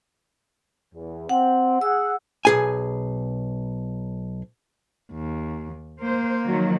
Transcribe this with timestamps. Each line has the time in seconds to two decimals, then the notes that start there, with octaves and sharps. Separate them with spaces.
0.95 E2
1.29 C4 F#5
1.81 G#4 F#5 E6
2.45 B1 G#4 G#5
5.12 D#2
6.01 A#3 C5
6.45 D#3 F3 F#3